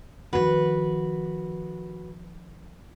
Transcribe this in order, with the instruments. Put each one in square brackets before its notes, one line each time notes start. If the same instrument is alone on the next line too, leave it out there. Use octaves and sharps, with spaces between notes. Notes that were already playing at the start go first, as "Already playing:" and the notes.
[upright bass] D#3 F3 [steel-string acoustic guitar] F#4 B4